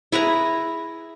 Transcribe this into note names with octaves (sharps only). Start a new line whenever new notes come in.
E4 G#4 B4 A#5